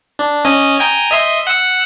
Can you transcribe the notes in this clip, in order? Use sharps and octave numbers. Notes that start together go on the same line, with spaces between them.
D4
C#4 D#5
G5 G#5 A#5
D#5 E5 C6
F#5 E6